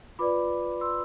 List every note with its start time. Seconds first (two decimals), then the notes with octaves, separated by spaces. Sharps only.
0.19 F4 B4 D5 B5 D6
0.81 C6 E6